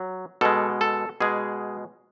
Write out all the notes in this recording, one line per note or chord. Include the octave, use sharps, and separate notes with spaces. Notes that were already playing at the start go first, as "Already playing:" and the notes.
Already playing: F#3
B2 G#3 A4
A4
B2 G#3 G#4